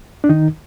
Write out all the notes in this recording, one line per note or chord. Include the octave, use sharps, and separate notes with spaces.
D4
D#3 D#4